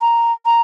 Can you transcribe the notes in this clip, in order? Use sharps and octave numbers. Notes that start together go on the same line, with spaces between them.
A#5
A#5